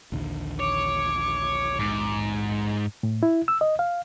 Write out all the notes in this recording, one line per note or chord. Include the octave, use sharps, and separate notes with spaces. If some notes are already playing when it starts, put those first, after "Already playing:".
A#1 D#2 D3
C#5 D6
G#2
A2
E4
E6
D#5
F5